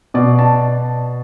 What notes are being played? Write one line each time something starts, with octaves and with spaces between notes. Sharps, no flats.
B2 D5
A5